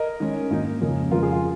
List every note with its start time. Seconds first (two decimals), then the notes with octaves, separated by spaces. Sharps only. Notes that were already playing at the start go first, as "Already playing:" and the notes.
Already playing: A#4 D#5
0.20 D#3 G#3 C#4
0.50 G#2 D#3 A#3 D#4
0.81 F2 C#3 A#3 C#4
1.11 F2 C#3 F3 G#3 F4 A#4
1.23 G#4
1.33 F4